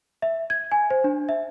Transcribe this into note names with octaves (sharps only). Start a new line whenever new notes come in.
E5
G#6
G#5
C5
D4
E5